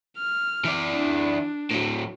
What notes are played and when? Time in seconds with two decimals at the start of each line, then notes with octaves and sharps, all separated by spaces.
0.17 F6
0.65 E3 D5
0.94 D4
1.71 A2 F#3